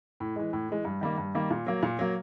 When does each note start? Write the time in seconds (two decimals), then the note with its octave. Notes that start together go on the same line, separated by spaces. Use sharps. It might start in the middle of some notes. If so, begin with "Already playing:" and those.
0.20 A2
0.36 E3 G#3
0.53 A2
0.69 E3 G#3
0.85 G2
1.01 D#3 G3 A#3
1.18 G2
1.35 D#3 G3 A#3
1.51 A#2
1.67 F#3 A#3
1.83 A#2
1.99 F#3 A#3